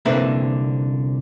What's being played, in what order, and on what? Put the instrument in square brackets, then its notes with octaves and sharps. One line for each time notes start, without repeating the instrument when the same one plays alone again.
[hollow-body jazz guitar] C2 D3 A#3 C4 B4 E5